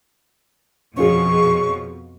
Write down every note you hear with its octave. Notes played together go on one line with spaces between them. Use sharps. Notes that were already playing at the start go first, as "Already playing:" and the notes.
F2 B2 F3 C#4 F4 G#4 C#6